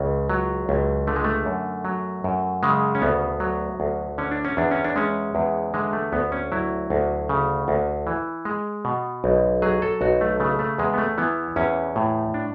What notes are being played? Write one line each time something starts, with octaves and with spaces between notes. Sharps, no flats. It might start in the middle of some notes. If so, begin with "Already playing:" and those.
Already playing: C#2 C#3
F#3
C#2
D3 A3
G#3
A3
F#2
F#3
F#2
C#3 G#3
C#4
D2 B3
F#3
D2
D3 C#4
D4
C#4
E2 D4
C#4
D4
G#3 C#4
E2
D3 G#3
A3
D2 B3
C#4
F#3 E4
D2
C#3
D2
E3
G#3
B2
B1
F#3 G#4
A4
B1 F#4
A3
C#3 A3
A3
E2 G#3
B3
A3
E3 B3
E2 C#4
A2
D4